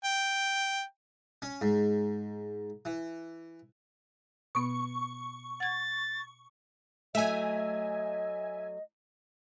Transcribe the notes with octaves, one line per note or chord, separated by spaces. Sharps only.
G5
C#4
G#2
E3
B2 B3 C#6
F#5 G#6 A6
F#3 A3 D#5 E5 G#5